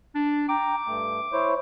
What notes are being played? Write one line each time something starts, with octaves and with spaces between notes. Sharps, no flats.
D4
G5 A#5 D6
G2 A3
E4 C5 C#5